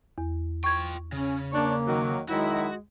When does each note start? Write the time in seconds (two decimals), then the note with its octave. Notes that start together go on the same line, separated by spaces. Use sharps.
0.18 E2
0.64 F4 G5 C#6 G#6
1.12 C#3 C#4
1.52 A#3 D4 C#5
1.86 D#3 F#3
2.29 D#3 F#3 G#3 E4 F#4